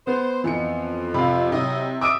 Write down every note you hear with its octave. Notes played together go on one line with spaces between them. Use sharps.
B3 C5
F2 E3 C#7
C3 F5 B5
C3 F#3 E4 D#5
C3 D#5 E5 D6 D#6 D7